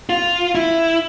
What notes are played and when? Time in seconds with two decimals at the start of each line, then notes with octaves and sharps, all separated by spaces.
0.09 F4
0.55 E4